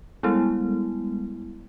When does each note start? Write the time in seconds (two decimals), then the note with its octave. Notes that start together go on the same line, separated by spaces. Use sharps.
0.23 G3 G#3 B3 E4